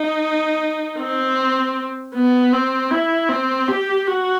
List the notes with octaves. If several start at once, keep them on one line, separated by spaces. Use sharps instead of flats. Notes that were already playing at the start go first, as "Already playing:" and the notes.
Already playing: D#4
C4
B3
C4
E4
C4
G4
F#4